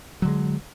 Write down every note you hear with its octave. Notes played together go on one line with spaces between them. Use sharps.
D3 F#3 G#3